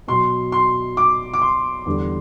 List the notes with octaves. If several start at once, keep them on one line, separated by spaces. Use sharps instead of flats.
B2 F#3 C6
C6
D6
D6
C6
E2 D3 G3